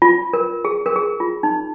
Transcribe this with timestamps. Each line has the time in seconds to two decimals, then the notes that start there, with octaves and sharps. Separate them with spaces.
0.02 F4
0.33 A#4
0.65 G#4
0.86 A#4
0.96 G#4
1.20 F4
1.43 D#4